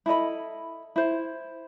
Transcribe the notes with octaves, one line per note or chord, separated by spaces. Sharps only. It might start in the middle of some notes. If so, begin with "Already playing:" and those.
E4 A4 D#5 B5
E4 C5